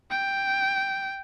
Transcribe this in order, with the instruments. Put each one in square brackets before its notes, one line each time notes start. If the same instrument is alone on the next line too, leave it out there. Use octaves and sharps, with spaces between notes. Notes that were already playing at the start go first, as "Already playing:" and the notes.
[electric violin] G5